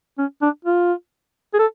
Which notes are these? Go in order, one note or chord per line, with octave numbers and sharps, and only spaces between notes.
C#4
D4
F4
G#4
A4